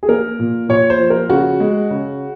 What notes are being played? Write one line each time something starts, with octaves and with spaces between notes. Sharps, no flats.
G#4
A#3 A#4
A#2
A#2 C#5
C5
F3
A#4
C#3 F#4
G#3
C#3